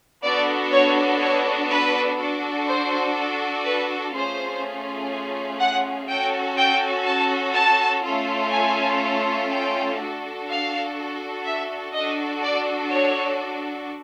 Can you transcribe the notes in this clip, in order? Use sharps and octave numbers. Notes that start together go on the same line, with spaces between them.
B3 D4 F#4 A4 D5
C#5
C#5
B4
D4 F#4 A4
C5
B4
A3 C#4 F4 G#4 C5
F#5
C#4 F#4 A4 G5
G5
A5
A5
A3 C#4 F4 A4
G#5
G5
D4 F#4 A4
F5
E5
D4 F#4 A4 D#5
D5
C#5